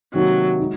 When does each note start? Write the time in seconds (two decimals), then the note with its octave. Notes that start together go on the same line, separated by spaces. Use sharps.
0.14 C3 D#3 F#3 A#3 D#4 F#4
0.60 G#3 D#4